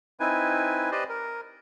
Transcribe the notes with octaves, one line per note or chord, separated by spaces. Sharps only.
C4 D#4 E4 B4 G#5
G4 B4 C5 D5 D#5
A#4